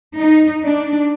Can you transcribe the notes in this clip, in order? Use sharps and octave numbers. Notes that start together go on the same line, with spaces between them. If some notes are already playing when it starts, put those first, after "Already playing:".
D#4
D4